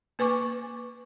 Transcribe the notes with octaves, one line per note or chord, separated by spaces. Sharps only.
A#3 B4 G#5 C#6 D6